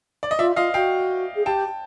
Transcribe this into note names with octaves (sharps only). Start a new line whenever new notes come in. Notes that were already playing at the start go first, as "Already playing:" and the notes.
D5
D#5
F4 D5 E5
F4 D#5 F5
F#4 F5 G5
G#4
G4 G5 A5